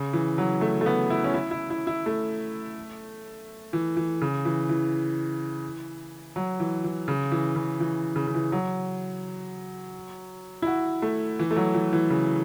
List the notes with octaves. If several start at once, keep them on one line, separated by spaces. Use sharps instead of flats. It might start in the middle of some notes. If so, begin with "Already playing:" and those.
Already playing: C#3
E3
F#3
A3
A3
B3
E4
C#4
E4
E4
E4
E4
A3
E3
E3
C#3
E3
E3
F#3
E3
E3
C#3
E3
C#3
E3
C#3
C#3
E3
F#3
E4
F#4
A3
E3
A3
F#3
E3
E3
C#3